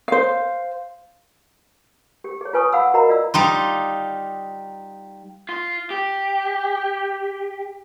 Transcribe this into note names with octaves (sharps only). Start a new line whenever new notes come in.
C5 F5
G4
G#4 C#5
F4 B4 G#5 C#6 D#6
G#4 F5 F#5 B5 E6
F#4 A#4 D#5 A#5 B5
F4 D5 D#5 E6
G3 D#4 F4
F4
G4